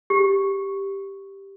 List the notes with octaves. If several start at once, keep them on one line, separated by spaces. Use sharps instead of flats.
G4